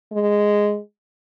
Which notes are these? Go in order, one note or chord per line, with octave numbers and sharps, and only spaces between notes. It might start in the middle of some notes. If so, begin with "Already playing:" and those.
G#3